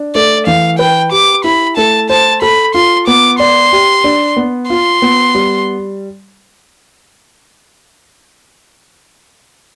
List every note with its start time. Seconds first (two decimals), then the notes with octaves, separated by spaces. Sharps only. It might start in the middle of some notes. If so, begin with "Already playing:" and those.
Already playing: D4
0.15 A3 D5
0.47 E3 F5
0.79 B4 G5
1.11 G4 D6
1.44 E4 B5
1.77 A3 A5
2.10 C5 A5
2.42 A4 B5
2.74 F4 C6
3.07 B3 D6
3.39 D5 C6
3.73 G4
4.04 D4
4.36 B3
4.69 F4 C6
5.02 B3
5.35 G3